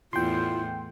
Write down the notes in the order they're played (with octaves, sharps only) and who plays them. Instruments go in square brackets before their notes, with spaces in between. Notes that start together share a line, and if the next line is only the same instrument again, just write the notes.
[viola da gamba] E2 A2 [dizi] E4 [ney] F4 [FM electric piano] G5 C6